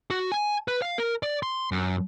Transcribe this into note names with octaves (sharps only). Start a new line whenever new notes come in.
F#4
G#5
B4
F5
A#4
D5
C6
F#2